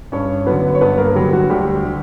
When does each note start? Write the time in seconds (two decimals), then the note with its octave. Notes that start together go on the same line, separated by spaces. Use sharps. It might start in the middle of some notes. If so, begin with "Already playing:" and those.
0.12 G2 C#4 C#5
0.46 D3 F#3 B3 B4
0.75 C#5
0.81 G2 B3 B4
0.98 A#3 A#4
1.08 A#4
1.15 D3 F#3 G3 G4
1.33 F#3 F#4
1.50 D2 G3 G4
1.85 D3